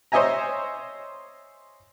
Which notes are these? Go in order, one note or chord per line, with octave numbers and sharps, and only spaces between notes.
C5 C#5 D#5 E5 G#5 A#5